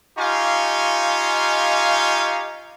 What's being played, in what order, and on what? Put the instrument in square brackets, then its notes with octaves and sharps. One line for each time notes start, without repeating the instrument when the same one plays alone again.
[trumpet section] D#4 F4 G4 F5 G#5 C#6